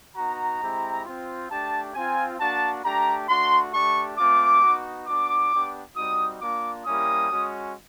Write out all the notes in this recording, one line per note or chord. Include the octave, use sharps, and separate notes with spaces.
B3 D#4 F#4 A#5
G#3 C4 E4 G4
C4 F4
A3 D4 G4 A5
C4 F4 G#5
A#3 D4 F#4 A5
A3 D4 G4 A#5
A3 D4 F#4 C6
A3 D4 G4 C#6
A3 C4 F4 D6
B3 D#4 F#4
B3 D4 F#4 D6
B3 D4 G4
G3 C4 D#4 F#4 D#6
A#3 D4 F4 D6
G3 A#3 C#4 E4 G4 D#6
G#3 C#4 F#4